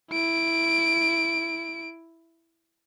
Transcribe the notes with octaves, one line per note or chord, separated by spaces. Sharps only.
E4 D7